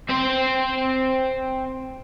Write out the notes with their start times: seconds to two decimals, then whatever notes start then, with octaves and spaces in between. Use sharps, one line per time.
0.09 C4 C5